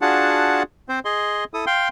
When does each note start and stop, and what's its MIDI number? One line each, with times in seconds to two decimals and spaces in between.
0.02 0.63 62
0.02 0.63 65
0.02 0.63 66
0.02 0.63 68
0.02 0.63 78
0.02 0.63 81
0.89 0.99 60
0.89 0.99 72
1.05 1.44 68
1.05 1.44 75
1.05 1.44 84
1.54 1.65 64
1.54 1.65 69
1.54 1.65 87
1.67 1.89 77
1.67 1.89 79
1.67 1.89 84